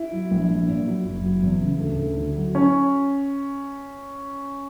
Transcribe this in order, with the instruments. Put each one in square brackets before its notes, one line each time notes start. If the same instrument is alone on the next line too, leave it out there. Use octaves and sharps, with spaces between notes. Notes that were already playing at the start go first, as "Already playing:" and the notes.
Already playing: [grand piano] E4
F#3
A#1
A#1
A#2
F#3
F#1
F#3
E2
C#3
D2
D2
D3
F#3
C#4